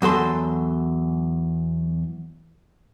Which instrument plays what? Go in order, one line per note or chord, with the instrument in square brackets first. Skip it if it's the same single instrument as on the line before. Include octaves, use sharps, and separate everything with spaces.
[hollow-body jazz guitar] E2 F#3 A4 C6